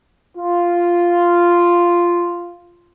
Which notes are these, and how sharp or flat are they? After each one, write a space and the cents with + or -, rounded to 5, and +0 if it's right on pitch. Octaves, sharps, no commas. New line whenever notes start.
F4 -5